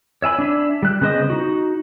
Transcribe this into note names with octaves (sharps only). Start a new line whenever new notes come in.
C#5 E5 G#5 B5
D4 E5
G3 F#6
C#3 B3 C5 D#5 D#6
D#4 F#4